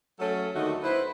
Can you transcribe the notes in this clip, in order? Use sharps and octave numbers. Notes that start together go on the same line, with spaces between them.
F#3 A3 C#4 A4
D#2 D3 D#3 A3 D#4 F#4
E4 B4 C5